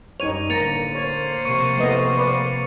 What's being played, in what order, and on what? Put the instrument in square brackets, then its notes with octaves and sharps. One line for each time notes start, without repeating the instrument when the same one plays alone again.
[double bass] F#2 G3 [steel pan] D#4 C#5 [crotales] D#7 F7
[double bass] A1 D3 [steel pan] A#3 A#5 [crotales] A6 C#7 F7
[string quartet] A#3 C5 [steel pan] C#5
[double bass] C3 F3 [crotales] C#6 C#7 D#7
[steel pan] A3 B3 D#5
B4 D5